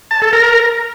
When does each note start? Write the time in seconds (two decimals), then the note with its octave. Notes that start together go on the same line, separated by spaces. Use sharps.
0.11 A5
0.22 A4
0.33 A#4